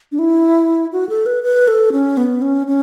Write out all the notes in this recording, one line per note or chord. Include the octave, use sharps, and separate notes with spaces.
D4
E4
F#4
A4
B4
B4
A4
C#4
B3
C#4
C#4